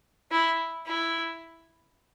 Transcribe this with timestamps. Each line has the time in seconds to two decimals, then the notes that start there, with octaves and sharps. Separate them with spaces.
0.31 E4
0.86 E4